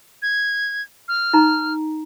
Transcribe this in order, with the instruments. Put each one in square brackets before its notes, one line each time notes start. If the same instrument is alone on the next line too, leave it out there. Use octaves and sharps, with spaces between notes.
[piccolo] G#6
F6
[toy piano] D#4 A#5